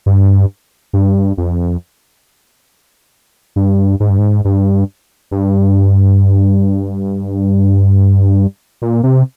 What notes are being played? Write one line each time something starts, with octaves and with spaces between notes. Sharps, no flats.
G2
G2
F2
G2
G#2
G2
G#2
G2
G2
A#2
C3